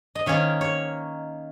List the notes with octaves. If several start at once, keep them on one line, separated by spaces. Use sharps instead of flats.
D#5
D#3 A#3 C#4 C#5
C#5